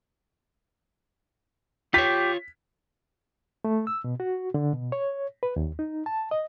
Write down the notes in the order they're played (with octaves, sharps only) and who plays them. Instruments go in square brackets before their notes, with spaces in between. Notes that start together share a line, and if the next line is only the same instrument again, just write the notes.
[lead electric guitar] F4 C#5 [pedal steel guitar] G4 [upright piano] B6
[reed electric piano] A3
E6
B2
F#4
D3
B2
C#5
B4
D#2
D#4
A5
D#5